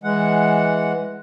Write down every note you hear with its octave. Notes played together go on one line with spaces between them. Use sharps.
E3 G#3 F#5